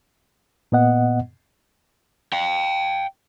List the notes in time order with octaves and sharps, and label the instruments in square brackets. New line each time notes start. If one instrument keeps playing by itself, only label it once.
[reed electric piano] A#2 B3 D#5 F#5
[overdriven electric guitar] F5 G5